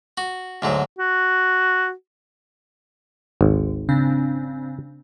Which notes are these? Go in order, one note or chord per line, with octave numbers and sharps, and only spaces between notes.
F#4
D2 G#2 F#3
F#4
G#1 D2
C#3 C4 D4